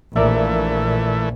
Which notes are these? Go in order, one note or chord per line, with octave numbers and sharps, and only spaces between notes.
A#1 E3 A3 A#4 D5 E5